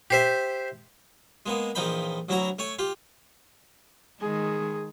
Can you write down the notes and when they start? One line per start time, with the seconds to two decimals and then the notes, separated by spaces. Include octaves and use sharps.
0.11 G4 C5 E5
1.46 G#3 A#3 B3
1.75 A#1 E3 F3 D#4 G5 B5
2.29 D2 F#3 E4 F#4 A#5
2.59 A3 C#5 G#5
2.79 F4 G4
4.21 D#3 G#3 G#4